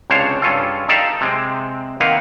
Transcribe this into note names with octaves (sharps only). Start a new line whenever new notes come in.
C#2 C3 D4 C5 C#5 F5
G2 C#4 F4 A4
D#4 G4 A4 D5 E5 F5
C3 G#3 C4
D#3 A#3 C4 B4 F5 F#5